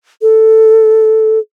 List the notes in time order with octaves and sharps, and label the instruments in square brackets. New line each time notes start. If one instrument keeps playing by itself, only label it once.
[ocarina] A4